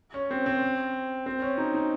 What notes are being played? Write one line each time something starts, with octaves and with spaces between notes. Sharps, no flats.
C#4
C4
C4
C4
C#4
D#4
D#4